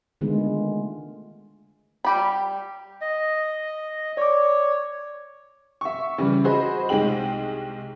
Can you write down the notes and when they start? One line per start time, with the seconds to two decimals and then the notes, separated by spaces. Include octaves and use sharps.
0.21 D3 D#3 G#3 A3 B3 F4
2.05 G3 G4 B5
3.01 D#5
4.17 C#5 D5 D6
5.81 E5 C#6
6.18 C#3 E3 G3
6.44 F#4 G#4 C5 D#5 B5
6.89 C2 G#3 D#4 G#4 G5 F#7